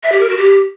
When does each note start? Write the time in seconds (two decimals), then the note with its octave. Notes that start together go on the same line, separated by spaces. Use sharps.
0.03 E5
0.12 G4
0.20 A#4
0.29 F#4
0.38 G4